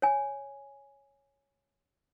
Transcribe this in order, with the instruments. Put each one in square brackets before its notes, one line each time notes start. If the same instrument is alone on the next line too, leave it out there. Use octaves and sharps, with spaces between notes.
[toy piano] C#5 G#5